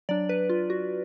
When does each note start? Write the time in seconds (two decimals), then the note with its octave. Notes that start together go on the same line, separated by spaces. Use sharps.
0.09 F#3 D4 D5
0.29 B4
0.49 F4
0.70 F#4